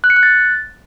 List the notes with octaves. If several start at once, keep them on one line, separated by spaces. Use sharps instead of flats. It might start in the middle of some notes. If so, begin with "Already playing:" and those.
F#6
C#7
F#6
A6